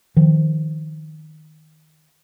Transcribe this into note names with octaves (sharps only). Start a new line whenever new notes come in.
D#3 F3